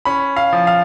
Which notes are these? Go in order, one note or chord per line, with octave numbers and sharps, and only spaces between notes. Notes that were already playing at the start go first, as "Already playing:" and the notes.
C#4 B5
F5
F3
F5